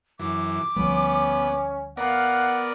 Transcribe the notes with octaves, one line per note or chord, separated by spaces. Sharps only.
F#2 E3 D6
D2 F3 G3 B3 C#4
B3 A#4 D5 F5 F#5